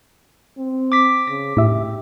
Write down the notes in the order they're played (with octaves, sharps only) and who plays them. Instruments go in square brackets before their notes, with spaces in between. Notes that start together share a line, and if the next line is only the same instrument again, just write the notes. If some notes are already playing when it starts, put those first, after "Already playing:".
[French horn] C4
[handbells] D6 B6
[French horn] C#3 [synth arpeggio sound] A#6
[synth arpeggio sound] A2 E5 [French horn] G4